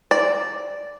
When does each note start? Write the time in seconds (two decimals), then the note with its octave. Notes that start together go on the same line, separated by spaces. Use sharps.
0.11 D5